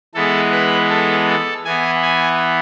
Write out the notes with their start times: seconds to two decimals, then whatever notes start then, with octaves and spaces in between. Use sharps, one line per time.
0.14 E3 G#3 B3 A4
0.52 B4
0.90 A4
1.28 A4
1.65 E3 B3 G#5
2.02 G#5